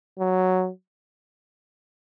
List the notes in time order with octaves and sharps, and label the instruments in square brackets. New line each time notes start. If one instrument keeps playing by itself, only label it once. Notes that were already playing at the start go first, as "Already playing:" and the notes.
[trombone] F#3